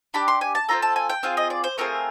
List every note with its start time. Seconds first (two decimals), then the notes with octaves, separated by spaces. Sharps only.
0.14 D4 G4 B5
0.28 C6
0.41 G#5
0.55 A5
0.69 C4 F4 A4 A#5
0.82 A5
0.96 G#5
1.10 G5
1.23 C4 F4 G#4 F5
1.37 D#5
1.50 D5
1.64 C5
1.78 A3 C4 F4 G#4 A#4